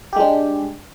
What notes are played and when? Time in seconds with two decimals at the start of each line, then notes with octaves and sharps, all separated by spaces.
0.13 G4
0.16 G#3
0.20 D4